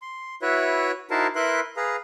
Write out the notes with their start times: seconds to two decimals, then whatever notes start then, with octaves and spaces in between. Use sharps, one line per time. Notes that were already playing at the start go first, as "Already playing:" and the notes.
0.02 C6
0.42 E4 F#4 B4 C#5 E5
1.11 D#4 E4 F#4 A#4 C5 A5
1.36 E4 A#4 B4 E5 C6 F#6
1.77 G#4 B4 F5 A#5